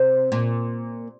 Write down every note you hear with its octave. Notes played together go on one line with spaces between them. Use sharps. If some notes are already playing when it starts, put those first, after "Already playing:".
Already playing: C3
A#2